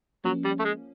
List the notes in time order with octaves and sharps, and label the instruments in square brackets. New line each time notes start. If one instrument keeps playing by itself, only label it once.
[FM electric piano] F3 A#3 C#4 [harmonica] F#3
[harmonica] G3
A3
G#3